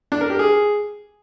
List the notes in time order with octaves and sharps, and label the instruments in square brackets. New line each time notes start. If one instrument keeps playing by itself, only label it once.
[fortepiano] D4
A#4
G4
G#4